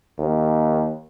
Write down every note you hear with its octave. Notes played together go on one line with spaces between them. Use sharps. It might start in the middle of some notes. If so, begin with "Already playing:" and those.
D#2